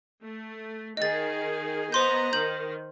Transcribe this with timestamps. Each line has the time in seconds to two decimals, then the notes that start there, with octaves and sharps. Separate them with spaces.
0.23 A3
0.97 D#3 G#4 D#5 A6
1.92 B3 C5 D#5 A#5 C6 G6
2.33 D#3 G6 F#7